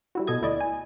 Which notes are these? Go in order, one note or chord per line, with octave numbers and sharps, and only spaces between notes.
G3 E4 F#4
B2 A4 D#5 G#6
D2 E4 D5 D#5
G#5